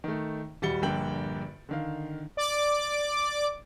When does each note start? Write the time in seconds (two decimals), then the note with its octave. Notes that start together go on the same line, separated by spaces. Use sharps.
0.04 D#3 A3
0.62 D#1 G3 F#4 A6 C#7 G7
0.82 A#1 G2 D3 A#3 G5 F#7
1.69 D3 D#3 F5
2.37 D5 D6